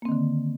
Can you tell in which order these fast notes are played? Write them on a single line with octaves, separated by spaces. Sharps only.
A#3 C4 D#3 D3